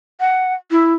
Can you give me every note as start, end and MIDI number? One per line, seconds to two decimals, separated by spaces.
0.20 0.54 78
0.71 0.93 64